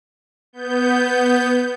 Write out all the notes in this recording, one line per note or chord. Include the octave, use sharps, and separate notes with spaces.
B3 G6